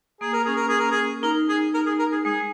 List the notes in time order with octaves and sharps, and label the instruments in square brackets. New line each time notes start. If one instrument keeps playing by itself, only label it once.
[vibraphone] A#3 [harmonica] G#4
[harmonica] A#4
[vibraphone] C#4 [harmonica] G#4
[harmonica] A#4
G#4
A#4
G#4
[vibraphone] D#4 [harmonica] A#4
[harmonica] G#4
A#4
G#4
A#4
G#4
[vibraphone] G#3 [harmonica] G#4